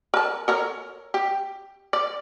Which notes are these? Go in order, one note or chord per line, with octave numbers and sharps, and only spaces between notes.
A#4 A5
A4 A#4 C#5
G4
D5